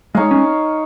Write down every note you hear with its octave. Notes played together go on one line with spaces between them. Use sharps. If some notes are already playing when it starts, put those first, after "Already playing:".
G#3 D#4 C#5 F5
C#4